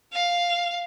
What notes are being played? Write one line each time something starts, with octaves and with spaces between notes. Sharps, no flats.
F5